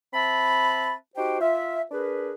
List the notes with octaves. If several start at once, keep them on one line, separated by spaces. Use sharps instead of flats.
C4 E5 A5 B5
D#4 F#4 G4 C5 G5
F4 E5
D4 G#4 A#4 B4